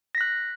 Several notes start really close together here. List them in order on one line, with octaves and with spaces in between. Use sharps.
A#6 B6 F#6